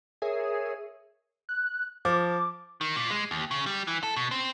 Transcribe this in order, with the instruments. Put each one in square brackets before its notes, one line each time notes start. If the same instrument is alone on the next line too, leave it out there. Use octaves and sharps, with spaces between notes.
[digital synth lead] G#4 [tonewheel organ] A#4 C#5 E5
[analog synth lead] F#6
[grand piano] F3 [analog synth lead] D6
[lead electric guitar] D#3
A#2
G#3
D#2
C#3
G3
E3
A4
B2
C4